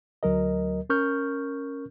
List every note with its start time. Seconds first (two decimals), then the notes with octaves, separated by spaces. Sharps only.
0.23 D2 F#3 A#4 D#5
0.90 C#4 A#4 C#6 F6 G6